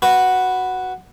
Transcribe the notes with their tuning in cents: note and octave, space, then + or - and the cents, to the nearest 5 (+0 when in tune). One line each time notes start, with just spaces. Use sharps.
F#4 +0 B4 +0